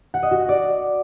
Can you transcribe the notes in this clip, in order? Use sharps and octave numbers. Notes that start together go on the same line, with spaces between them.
F#5
D#5
F#4
F#5
D5